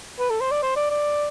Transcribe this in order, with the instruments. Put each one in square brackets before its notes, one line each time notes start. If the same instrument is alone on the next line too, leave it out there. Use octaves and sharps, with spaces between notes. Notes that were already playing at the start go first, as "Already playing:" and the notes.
[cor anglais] B4
A4
C5
D5
C5
D5
D5